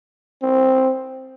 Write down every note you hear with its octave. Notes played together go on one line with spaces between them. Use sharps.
C4